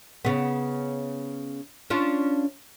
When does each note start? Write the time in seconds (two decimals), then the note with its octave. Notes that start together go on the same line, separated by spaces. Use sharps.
0.25 C#3 B3
1.90 C#4 D4 F4